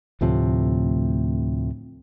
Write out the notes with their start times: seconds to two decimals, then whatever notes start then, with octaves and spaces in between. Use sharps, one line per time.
0.21 D2 A2 C3 F3